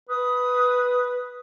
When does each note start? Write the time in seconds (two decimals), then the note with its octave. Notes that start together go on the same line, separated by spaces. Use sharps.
0.09 B4 D#6